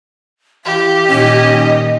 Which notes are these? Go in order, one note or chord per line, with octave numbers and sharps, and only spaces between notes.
E3 G4 F5
A#2 D#3 C#4 D#4 D#5